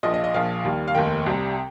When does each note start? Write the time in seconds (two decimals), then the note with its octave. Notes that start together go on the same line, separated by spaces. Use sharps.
0.03 A#1 A#2 F3 D#5
0.14 D#5
0.24 D#5
0.34 A#1 A#2 F3 F5
0.64 D#2 D#3 G3
0.88 F5
0.95 F1 D#2 D#3 G5
1.26 C2 C3 G3